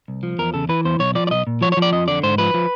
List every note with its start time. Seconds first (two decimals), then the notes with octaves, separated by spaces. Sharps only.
0.08 C2
0.23 F3
0.39 E2 A#4
0.54 C#3 A4
0.69 E3 B4
0.85 E2 C5
0.99 B1 C#5
1.15 F3 D5
1.27 D5
1.31 B1 D#5
1.47 A#2
1.61 F3 C#5
1.72 C#5
1.77 F3
1.82 D5
1.93 F2 D#5
2.08 D3 D5
2.23 G#2 C5
2.38 F3 B4
2.54 F3